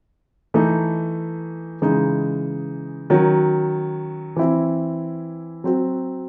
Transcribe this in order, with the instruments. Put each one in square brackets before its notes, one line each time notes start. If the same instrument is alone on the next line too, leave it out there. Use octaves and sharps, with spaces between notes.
[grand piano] E3 A3 D#4
C#3 E3 G#3 D#4
D#3 F#3 C#4 F#4
E3 C4 E4
F#3 C4 F#4